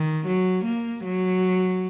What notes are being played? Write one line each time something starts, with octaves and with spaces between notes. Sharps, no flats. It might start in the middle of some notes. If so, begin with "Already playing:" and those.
Already playing: D#3
F#3
A#3
F#3